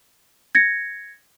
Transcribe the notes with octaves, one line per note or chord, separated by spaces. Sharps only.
G#6 A#6 C#7